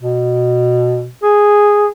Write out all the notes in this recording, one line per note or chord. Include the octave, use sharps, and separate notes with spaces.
B2
G#4